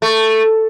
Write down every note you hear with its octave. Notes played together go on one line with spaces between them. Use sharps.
A3